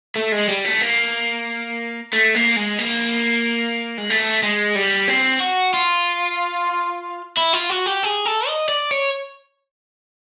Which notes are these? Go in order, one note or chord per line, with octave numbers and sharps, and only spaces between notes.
A3
G#3
G3
A3
A#3
A3
A#3
G#3
A#3
G#3
A3
G#3
G3
C4
F#4
F4
E4
F4
F#4
G4
G#4
A4
D#5
D5
C#5